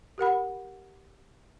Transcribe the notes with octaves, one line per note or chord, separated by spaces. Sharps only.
G4 A#4 F#5 B5